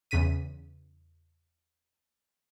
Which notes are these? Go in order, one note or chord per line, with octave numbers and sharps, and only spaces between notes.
E2 C#3 B6 D#7